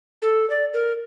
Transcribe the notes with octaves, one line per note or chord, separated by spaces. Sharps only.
A4
D5
A#4